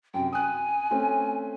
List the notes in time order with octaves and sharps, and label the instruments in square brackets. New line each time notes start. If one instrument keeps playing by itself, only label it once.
[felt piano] F#2 C3 [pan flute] G5
[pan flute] G#5 [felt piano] D#6 F#6
[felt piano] A3 C4 C#4